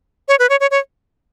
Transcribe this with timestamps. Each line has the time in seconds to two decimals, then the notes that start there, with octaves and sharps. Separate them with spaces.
0.28 C#5
0.39 B4
0.50 C#5
0.60 C#5
0.71 C#5